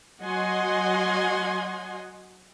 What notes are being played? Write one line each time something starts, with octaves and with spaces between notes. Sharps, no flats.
F#3 D#5 F#5 G#5 C6